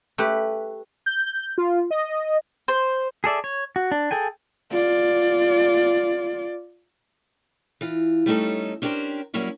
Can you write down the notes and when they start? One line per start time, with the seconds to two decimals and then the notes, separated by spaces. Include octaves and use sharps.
0.18 A3 G4 B4
1.06 G6
1.58 F4
1.91 D#5
2.68 C5
3.24 G#4 A4 D5 E5
3.44 C#5
3.76 F#4
3.92 D4
4.11 G#4 A4 G5 G#5
4.71 F4 D5
7.81 E3 F4
8.26 G3 A3 B3 C#4 D#4 A4
8.82 C#4 D4 G4 A4 A#4 C5
9.34 F#3 G3 A#3 C#4 E4